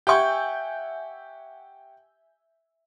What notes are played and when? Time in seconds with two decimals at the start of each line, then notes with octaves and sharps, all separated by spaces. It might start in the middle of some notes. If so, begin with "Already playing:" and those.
0.07 G4 E5 F#5 G#5 C#6 G6